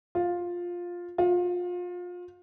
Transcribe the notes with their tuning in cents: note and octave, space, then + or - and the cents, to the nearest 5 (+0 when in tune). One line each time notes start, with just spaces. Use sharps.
F4 +10
F4 +30